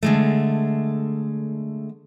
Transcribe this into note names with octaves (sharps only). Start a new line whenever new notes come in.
D3 G#3 A3